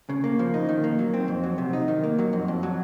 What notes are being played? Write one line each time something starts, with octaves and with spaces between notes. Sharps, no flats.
C#3
A#3
F3
D#4
D#3
A#3
F#3
C4
F2
F#3
C3
D#4
D#3
A#3
F#3
F2
F2
F#3